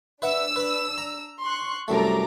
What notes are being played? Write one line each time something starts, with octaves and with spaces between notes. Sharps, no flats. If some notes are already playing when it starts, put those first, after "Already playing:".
D4 B4 E5 F#5 E6
B4 B5
A#5
C6 C#6 F#6
C2 F#2 A3 A4 A#5 D6